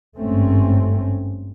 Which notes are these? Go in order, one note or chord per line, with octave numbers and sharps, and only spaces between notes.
G#1 G2 A3 C4 C#4